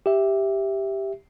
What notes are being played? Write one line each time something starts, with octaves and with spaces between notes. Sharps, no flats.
G4 E5